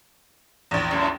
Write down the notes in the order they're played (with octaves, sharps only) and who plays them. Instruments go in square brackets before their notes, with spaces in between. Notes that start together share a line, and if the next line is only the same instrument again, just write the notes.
[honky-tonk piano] A#1 E2
[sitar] F#2 A2